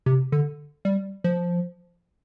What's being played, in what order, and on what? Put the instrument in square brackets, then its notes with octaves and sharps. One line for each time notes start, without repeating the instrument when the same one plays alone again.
[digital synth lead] C3
D3
G3
F3